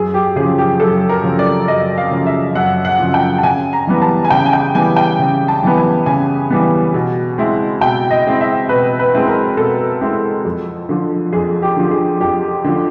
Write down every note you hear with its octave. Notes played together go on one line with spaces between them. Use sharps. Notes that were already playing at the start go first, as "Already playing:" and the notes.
Already playing: F#2 G#4
G4
C#3 F3 G#4
G4
F#2 A4
A#4
C#3 F3
D5
F#2 D#5
F5
C#3 F3
E5
F#2 F#5
F#5
C#3 F3
G5
A5
C#3 G#5
A#5
E3 G3 B3
A5
G#5
C#3 G5
G#5
G5
E3 G3 B3 G#5
G5
C#3
A5
E3 G3 B3
G#5
C#3 G#5
E3 G3 B3
B2
G#3 C4 E4
B2 G5
D#5
G#3 C4 E4
E5
B2 B4
B4
G#3 C4 E4
A#4
B2 A4
G#3 C4 E4
F2
D3 F3
F2 G#4
G4
D3 F3
G#4
F2 G4
D3 F3